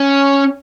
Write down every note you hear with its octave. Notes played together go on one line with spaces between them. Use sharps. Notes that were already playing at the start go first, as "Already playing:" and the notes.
Already playing: C#4